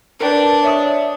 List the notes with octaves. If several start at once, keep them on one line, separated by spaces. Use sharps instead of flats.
D4 A#4 B4 G5
C#5 E5 D#6